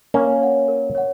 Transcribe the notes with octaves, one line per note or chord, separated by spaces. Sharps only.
A#3 C#4 A#4
C#5 F#5
A#4
C#5 F#5